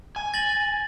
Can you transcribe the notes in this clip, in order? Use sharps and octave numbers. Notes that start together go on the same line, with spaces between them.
G#5
A6 A#6 F#7